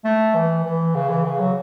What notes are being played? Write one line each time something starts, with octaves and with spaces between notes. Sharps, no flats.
A3
E3
E3
C#3
E3
C#3
F#3